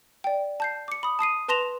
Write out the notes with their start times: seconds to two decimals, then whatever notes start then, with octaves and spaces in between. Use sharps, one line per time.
0.24 D5 G5
0.60 A5 G6 C7
0.88 D6 C#7
1.03 B5 D#6
1.19 A5 D#6 C7 D#7
1.48 B4 A5 C6 A#6 E7 F7